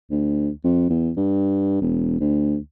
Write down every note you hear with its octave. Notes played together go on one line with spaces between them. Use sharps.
D2
F2
E2
G2
E1
D2